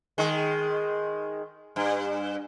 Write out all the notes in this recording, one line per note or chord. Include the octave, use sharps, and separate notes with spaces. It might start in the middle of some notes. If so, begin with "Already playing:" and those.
D#3 G#3
G2